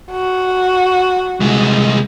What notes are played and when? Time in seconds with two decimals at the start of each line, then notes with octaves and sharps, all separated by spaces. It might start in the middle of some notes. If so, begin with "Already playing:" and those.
0.11 F#4
1.40 C2 G#3